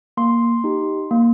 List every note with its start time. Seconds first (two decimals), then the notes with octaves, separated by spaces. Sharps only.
0.17 A#3 C6
0.64 D#4 G4
1.11 A#3